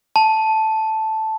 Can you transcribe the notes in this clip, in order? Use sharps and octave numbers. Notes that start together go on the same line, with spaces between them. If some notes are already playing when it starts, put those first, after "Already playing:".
A5